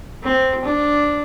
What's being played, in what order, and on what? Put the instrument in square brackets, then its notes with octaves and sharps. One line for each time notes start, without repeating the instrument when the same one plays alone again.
[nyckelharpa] C4
D4